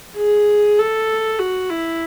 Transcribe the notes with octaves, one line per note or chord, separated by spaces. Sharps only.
G#4
A4
F#4
E4